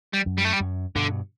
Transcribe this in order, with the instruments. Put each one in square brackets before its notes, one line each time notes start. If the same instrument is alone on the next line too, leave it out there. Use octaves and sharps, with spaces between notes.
[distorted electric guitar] G3
[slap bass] F#2
[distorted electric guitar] G3
A3
G3
[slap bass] F#2
[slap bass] G2 B2 [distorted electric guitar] D3